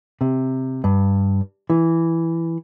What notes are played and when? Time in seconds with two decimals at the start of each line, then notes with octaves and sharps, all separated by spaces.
0.21 C3
0.84 G2
1.70 E3